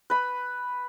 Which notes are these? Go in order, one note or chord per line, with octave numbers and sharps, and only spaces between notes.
B4 B5